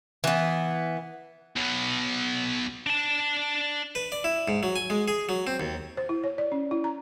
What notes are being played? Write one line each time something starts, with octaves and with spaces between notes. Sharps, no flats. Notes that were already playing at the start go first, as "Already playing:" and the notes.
E3 B3
B1 B2
D4 A5
B4
D5
E4
G#2
F#3
G#5
G#3
G#4
F#3
C4
D#2
C5
E4
C#5
D5
C#4
E4
A#5